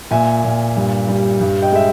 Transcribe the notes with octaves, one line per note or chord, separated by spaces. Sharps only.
A#2 E5 G#5
A#2
G2
G3
G2
D#5 G5
G#3 E5